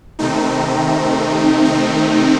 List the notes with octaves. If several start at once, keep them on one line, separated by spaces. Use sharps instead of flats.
C3 D#3 A3 C4 D#4
D#4